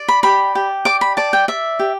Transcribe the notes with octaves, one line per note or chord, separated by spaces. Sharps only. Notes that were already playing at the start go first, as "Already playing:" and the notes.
Already playing: D5
B5
G4 B5
G4
D5 D6
B5
D5 A5
G5
D5 E5
G4